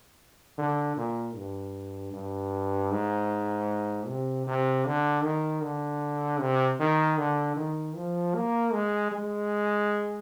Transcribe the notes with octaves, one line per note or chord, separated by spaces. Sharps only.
D3
A#2
G2
G2
G#2
C3
C3
D3
D#3
D3
C3
D#3
D3
D#3
F3
A#3
G#3
G#3